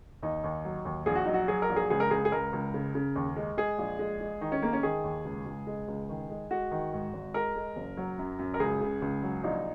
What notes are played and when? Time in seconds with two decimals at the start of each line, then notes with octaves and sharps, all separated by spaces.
0.23 D#2 D#4
0.44 D#2
0.65 F#3
0.85 D#2
1.06 A#1 G#4
1.15 F#4
1.25 F#3 D#4
1.34 F#4
1.48 F#3 G#4
1.62 A#4
1.69 A#1
1.76 G#4
1.90 C#2 G#4
2.00 A#4
2.11 C#2 G#4
2.25 G#4
2.32 C#2 A#4
2.53 C#2
2.74 C#3
2.95 C#3
3.16 D#2
3.36 G#3
3.57 G#3 G#4
3.78 A#1
3.99 G#3
4.21 G#3
4.41 D#3 D#4
4.52 C#4
4.62 G#3 A#3
4.73 C#4
4.83 D#3 G#4
5.04 D#2
5.25 C#2
5.46 C#2
5.67 G#3
5.88 C#2
6.09 D#3
6.30 G#3
6.51 G#3 F#4
6.71 D#3
6.93 G#2
7.13 G#1
7.34 G#3 A#4
7.55 G#3
7.76 F#1
7.97 F#3
8.18 F#2
8.39 F#2
8.54 A#4
8.60 C#2 G#4
8.81 C#3
9.02 C#2
9.23 F#3
9.44 A#1 D#4